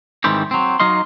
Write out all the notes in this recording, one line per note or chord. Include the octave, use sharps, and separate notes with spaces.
G#2 D#3 E3 G3 C4 G4
F#3 C4
F#3 D#4 D#5 F5 C6